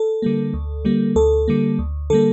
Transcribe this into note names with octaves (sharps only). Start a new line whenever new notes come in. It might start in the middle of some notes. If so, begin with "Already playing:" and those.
Already playing: A4
D3 G3 A#3
D2
D3 G3 A#3
D2 A4
D3 G3 A#3
D2
D3 G3 A#3 A4